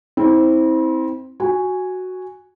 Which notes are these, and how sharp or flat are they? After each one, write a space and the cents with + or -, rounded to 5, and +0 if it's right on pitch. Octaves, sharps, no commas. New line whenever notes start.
C4 +0 E4 -35
F#4 +0 G#5 -5